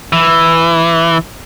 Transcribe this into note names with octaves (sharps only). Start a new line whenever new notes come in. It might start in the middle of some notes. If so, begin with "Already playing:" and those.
E3